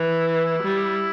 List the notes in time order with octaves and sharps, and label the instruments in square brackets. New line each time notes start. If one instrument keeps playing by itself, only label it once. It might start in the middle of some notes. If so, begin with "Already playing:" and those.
Already playing: [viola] E3
[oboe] E4
E4
E4
[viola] G3